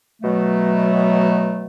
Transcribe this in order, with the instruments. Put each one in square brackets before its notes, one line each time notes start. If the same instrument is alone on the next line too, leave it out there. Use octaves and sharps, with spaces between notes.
[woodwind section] B2 F#3 A3